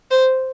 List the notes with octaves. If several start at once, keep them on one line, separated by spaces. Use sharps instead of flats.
C5